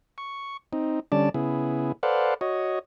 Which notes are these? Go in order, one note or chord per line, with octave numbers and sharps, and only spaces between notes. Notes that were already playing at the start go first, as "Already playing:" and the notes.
C#6
C4 D#4
D3 G3 C#4 D5 A5
C#3 B3 E4 G#4
A4 B4 C5 D5 F5 F#5
F#4 C#5 D#5